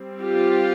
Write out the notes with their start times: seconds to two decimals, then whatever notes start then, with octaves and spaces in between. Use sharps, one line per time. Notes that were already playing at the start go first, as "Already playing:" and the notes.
Already playing: G3 C4
0.22 F4 G4